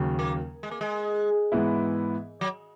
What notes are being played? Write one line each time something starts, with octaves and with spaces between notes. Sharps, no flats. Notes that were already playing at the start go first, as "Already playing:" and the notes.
Already playing: D#2 C#3 F#3
A#3
G#3
A#3
G#3
G#2 E3 B3 E4
F#3